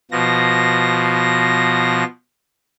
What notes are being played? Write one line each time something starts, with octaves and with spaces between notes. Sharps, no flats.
B2 F3 A#6